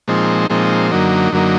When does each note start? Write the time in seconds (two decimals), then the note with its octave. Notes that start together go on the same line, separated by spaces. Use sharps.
0.08 A#2 F3 G#3 C4 D#4
0.50 A#2 F3 G#3 C4 D#4
0.91 F#2 D3 F#3 A#3 D#4
1.32 F#2 D3 F#3 A#3 D#4